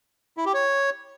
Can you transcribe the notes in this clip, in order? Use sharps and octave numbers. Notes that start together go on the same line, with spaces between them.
E4
G4
C#5